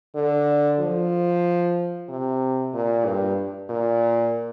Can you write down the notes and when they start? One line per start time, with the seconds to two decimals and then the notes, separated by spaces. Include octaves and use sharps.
0.15 D3
0.80 F3
2.09 C3
2.74 A#2
3.05 G2
3.69 A#2